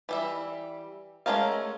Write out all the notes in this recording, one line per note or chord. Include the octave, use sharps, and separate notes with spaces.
E3 G3 E5
G#3 A3 C#4 A#4 F5